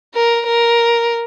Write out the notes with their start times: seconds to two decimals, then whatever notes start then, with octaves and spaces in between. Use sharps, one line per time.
0.14 A#4
0.46 A#4